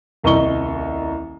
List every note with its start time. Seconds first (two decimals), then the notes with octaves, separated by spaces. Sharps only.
0.23 D#1 C2 D#5 A#5 C#6 G7